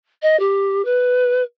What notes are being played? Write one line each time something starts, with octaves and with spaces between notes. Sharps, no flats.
D#5
G4
B4